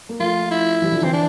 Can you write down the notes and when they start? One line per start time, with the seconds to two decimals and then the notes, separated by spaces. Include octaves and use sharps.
0.09 A#3
0.19 F3 A3 F4
0.51 E4
0.82 E3 G3
0.92 D3 F3
1.03 E3 C4
1.13 D4